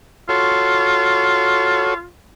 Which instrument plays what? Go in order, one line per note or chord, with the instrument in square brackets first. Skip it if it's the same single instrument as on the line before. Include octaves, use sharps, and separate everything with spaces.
[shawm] F4 [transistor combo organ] F#4 A4 C#5